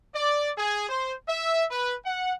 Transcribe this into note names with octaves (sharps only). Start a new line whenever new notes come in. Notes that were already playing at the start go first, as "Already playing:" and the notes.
D5
G#4
C5
E5
B4
F#5